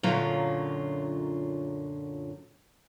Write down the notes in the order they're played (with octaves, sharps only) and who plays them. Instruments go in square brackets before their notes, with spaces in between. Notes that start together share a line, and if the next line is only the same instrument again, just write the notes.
[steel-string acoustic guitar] F#2 A#2 D3 F#3 F4